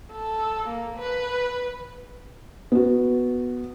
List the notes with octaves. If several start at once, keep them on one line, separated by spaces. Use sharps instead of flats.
A4
A#3
B4
B3 F#4